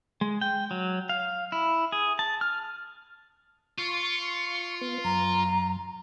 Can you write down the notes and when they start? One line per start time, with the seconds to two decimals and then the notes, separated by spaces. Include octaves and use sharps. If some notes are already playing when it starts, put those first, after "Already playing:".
0.21 G#3
0.41 G5
0.71 F#3
1.09 F5
1.52 E4
1.92 G#4
2.19 A5
2.41 F6
3.78 F4 C#6
4.81 B3
5.05 F#2 A#5